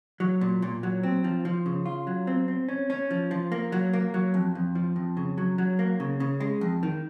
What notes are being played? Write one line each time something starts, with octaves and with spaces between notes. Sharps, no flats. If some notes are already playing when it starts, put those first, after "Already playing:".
F#3
A#2
A#2
F#3
C4
F3
F3
C#3
F4
F#3
C4
C4
C#4
C#4
F3
F3
A#3
F#3
A#3
F#3
F2
F2
F3
F2
C#3
F#3
F#3
A#3
C#3
C#3
G#3
F2
D#3